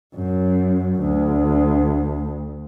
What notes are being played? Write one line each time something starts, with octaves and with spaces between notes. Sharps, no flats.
F#2
D2